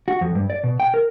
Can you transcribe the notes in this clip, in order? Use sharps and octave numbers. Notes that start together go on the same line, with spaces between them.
F#4
F2
G2
D5
B2
G5
A#4